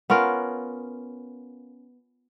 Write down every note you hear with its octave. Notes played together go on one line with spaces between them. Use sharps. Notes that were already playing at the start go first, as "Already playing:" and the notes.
B3 C#4 F4 A#4